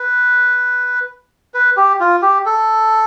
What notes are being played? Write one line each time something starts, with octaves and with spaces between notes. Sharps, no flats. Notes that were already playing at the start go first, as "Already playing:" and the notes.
Already playing: B4
B4
G4
F4
G4
A4